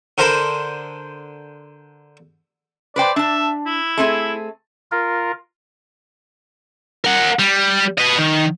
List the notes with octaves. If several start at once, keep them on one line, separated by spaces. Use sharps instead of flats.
D3 A#4 C5 A5 B5
B4 C5 D5 G5
D4 E5 A5
E4
A3 C4 G#4
F4 A#4
A#4 F#5
G3
B4 D#5
D#3